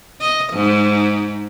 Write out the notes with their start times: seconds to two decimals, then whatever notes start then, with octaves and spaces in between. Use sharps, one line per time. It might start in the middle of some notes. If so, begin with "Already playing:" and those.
0.21 D#5
0.53 G#2